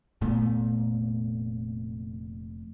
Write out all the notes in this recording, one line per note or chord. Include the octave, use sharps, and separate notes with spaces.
F1 A#2 A3 B3